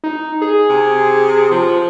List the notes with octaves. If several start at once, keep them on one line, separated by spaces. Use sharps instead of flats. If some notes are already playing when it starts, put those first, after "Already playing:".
D#4
G#4
C3
F3